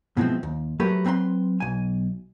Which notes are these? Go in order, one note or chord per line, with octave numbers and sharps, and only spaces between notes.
B2 E3 F3 G#3 C4
D#2
F#3 A3 G4 A#4 B4
F#3 C4 B4 A#5 C6
B1 G#5